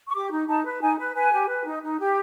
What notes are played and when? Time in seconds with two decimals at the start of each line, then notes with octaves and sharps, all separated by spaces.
0.08 C#6
0.14 G4 D6
0.31 D#4
0.48 D#4 A5
0.65 B4
0.81 D#4 G#5
0.98 B4
1.15 B4 G#5
1.32 G4
1.48 B4
1.65 D#4
1.82 D#4
1.99 G4